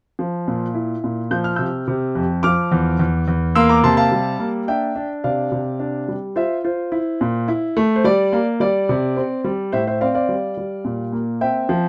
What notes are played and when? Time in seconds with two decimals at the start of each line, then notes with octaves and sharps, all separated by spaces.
0.19 F3
0.48 A#2
0.75 E4
1.04 A#2
1.31 F3 G6
1.44 F6
1.56 C3 E6 G6
1.88 C3
2.15 F2
2.43 F3 D6 F6
2.72 E2
2.99 E2
3.28 E2
3.55 A#3 C6 E6
3.69 A#5 D6
3.83 C3 A5 C6
3.97 F5 A5
4.11 G3
4.39 A#3
4.68 D4 E5 G5
4.96 D4
5.24 C3 D5 F5
5.52 C3
5.80 D4
6.08 G3
6.36 F4 C5 E5
6.64 F4 C5
6.92 E4
7.21 A#2
7.48 E4
7.77 A3
7.96 C5
8.04 G3 D5
8.33 A#3
8.60 G3 D5
8.89 C3
9.17 C4
9.44 G3
9.72 A2 C5 E5
9.87 C5 E5
10.01 C4 D5 F5
10.14 D5 F5
10.29 G3
10.57 G3
10.85 A#2
11.12 A#3
11.41 C4 E5 G5
11.69 F3